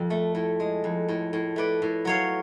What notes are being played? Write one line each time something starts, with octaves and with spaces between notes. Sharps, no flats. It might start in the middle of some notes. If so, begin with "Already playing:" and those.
Already playing: F2
A3
A2
G#3
F2
A2
A2
A3 B4 D5
A2
F#3 C#5 F5